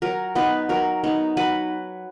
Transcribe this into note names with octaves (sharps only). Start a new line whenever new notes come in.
F#3 A#4
B3 D#4 B4
F#3 A#4
B3 D#4
F#3 B4